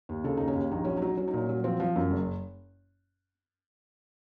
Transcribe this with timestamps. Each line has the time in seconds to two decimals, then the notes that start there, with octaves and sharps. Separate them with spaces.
0.09 D#2
0.24 C#3 A4
0.37 D#2 D#4
0.48 C#4
0.55 D#2
0.71 A#1 D#4
0.85 F#3 C#4
0.97 F#3 D#4
1.17 F#3 C#4
1.28 D#4
1.33 A#2 C#4
1.49 F#3
1.64 F3 C4
1.80 F3
1.96 F#2
2.11 F#1